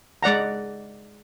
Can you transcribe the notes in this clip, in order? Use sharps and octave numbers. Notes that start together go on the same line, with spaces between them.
G#3 D5 F#5 A#5